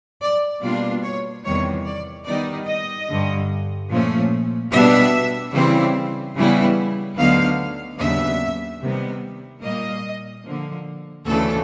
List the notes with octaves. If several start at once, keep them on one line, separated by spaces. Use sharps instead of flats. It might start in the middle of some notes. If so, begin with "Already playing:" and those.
D5
B2 G3 A#3 D4 F4 D5
C#5
E2 C3 D#3 G3 C#5
D5
D#3 G3 B3 D#4 D5
D#5
G2 D3 G3
A#2 F3 A3 C#4
B2 G3 B3 D4 E5
C#3 E3 G3 C4 E4
C#3 E3 G3 B3 E4
D2 D3 F#3 B3 D#4 F5
D#2 C#3 F#3 B3 D4 E5
C3 D#3 G3 B3
A#2 G3 A#3 D#5
D3 F3 A#3
D2 C#3 E3 A3 A4